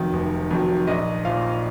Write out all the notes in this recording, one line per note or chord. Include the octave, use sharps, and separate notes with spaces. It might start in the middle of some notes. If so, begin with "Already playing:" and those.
Already playing: F1 F2 D#3 F#3
F1
F2 D#3 F#3
A#1 D#5
A#2 F3 F5